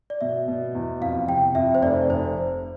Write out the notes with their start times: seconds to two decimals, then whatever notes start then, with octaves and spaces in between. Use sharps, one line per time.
0.10 D5
0.21 B2 E5
0.48 B2
0.75 E2
1.01 F2 F5
1.28 C3 G5
1.55 F2 E5
1.75 C5
1.82 F1 D5
2.09 F1 C5